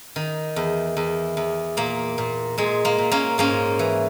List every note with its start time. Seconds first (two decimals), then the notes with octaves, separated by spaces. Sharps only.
0.16 D#3
0.56 E2
0.97 E2
1.37 E2
1.77 A#2 A#3
2.18 A#2
2.58 A#2 G#3
2.85 A#3
2.98 A#2
3.11 A#3 C#4
3.38 G#2 A#3 C#4
3.79 E3